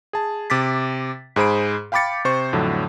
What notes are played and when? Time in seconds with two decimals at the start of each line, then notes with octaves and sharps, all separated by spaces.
0.13 G#4 A5
0.50 C3 D6 A6 B6
1.36 G#2 G#4 C5 B5 D7
1.92 F5 G5 B5 D6 A6 C#7
2.25 C3 C5 C#6
2.53 F2 A2 D3 F#3